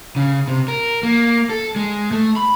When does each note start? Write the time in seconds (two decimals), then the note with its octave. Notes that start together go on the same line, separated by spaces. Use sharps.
0.16 C#3
0.48 C3
0.68 A#4
1.03 A#3
1.50 A4
1.76 G#3
2.11 A3
2.36 B5